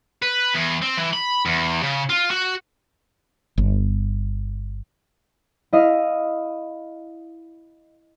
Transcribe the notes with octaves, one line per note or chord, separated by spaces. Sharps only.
B4
E2
C4
E3
B5
E2
C#3
F4
F#4
G1
E4 D#5 F5